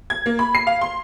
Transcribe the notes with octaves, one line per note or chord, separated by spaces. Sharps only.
G#6
A#3
B5
C7
F5
C6